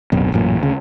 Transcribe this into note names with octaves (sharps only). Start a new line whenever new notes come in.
D1 F#2 B2
A1 F#2 A#2
D2 C#3